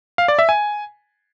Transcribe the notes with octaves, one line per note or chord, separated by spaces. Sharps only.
F5
D5
E5
G#5